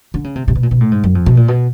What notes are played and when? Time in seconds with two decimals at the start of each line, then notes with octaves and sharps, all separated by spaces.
0.14 D3
0.24 C#3
0.35 C3
0.48 C3
0.55 B2
0.63 A#2
0.71 B2
0.81 A2
0.91 G#2
1.04 F#2
1.15 F2
1.26 B2
1.37 A#2
1.48 B2